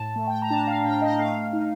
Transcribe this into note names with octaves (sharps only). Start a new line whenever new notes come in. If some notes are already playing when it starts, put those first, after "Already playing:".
Already playing: A2 A5
A3
G5
A#5
D4 A5
F5
A2 G5
D#5
A3 F5
D#4